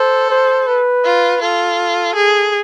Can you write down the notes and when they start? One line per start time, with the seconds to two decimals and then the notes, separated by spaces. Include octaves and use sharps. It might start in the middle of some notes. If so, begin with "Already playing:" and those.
Already playing: A4 C5
0.30 C5
0.67 B4
1.05 F4
1.41 F4 A4
2.15 G#4